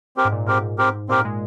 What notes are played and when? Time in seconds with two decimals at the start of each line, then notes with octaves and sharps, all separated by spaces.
0.17 C4 G4 A#4
0.25 G#2
0.32 A#2
0.47 G#2 C4 G4 A#4
0.78 C4 G4 A#4
1.09 A#2 C4 G4 A#4
1.25 G#3